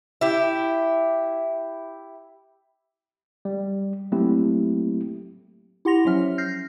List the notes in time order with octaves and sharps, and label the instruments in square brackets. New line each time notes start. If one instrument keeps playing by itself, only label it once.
[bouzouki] E4 G4
[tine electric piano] G3
F#3 A3 A#3 C4 E4 G4
[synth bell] E4 G4 F#5 C6 A#6 F7
F3 F#3 C#4 E5 F6
F6 G6 A#6 C7